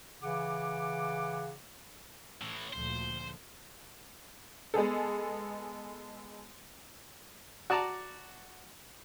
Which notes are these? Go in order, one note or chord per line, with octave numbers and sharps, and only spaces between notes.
C#3 E3 F#5 D6
A2 E3
D2 A#2 F3 C5
G#3 B3 G#4 A4
F#4 D5 A5 A#5 D6